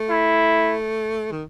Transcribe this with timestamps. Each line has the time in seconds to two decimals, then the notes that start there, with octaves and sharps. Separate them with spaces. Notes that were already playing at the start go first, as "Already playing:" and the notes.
Already playing: A3
0.10 E4
1.32 D#3